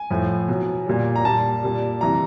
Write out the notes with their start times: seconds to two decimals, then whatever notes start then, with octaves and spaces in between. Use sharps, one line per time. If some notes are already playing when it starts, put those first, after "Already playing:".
Already playing: G#5
0.10 A2 F3
0.48 B2 F#3
0.86 A#2 G3
1.16 A#5
1.25 A#2 G3 A5
1.63 A#2 G3
2.01 C3 E3 G3 A#5